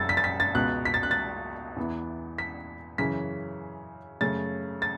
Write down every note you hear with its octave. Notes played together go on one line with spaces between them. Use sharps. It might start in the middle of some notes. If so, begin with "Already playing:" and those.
Already playing: F#1 F#2 C#3 E6 A6
B6
A6
B6
A6
C#2 B2 B3 F#6
B6
A6
F#6
A6
E2 E3 B3
B6
F#2 C#3 E3 C#4 B6
F#2 C#3 A3 C#4 A6
A6